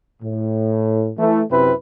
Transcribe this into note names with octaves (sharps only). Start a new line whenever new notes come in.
A2
E3 A3
F#2 C3 C4 E4 B4